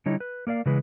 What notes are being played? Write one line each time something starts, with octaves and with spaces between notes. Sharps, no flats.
D3 G3 D#4 E4 C#5
B4
A#3 A#4 D5 F5
C#3 E3 G#3 B4